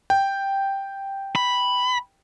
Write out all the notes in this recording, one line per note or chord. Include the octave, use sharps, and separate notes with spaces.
G5
B5